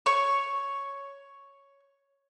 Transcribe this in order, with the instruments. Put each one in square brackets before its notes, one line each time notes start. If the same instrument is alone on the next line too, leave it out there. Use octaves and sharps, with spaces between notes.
[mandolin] C#5 C#6